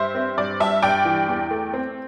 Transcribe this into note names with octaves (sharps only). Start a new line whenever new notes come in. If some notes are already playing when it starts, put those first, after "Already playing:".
Already playing: G2 C5 E5
C4
G2 D5
G3 E5 A5
G2 D5 G5
E3
E2
A3
C4